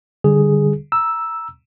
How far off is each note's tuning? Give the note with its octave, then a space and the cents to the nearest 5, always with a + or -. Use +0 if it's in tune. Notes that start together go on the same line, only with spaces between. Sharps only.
D3 +0 G3 +5 G#4 +0
A#5 +15 E6 +0